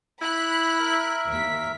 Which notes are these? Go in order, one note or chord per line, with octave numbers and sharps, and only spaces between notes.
E4 B5 F#6
A#4 E5
D#2 B6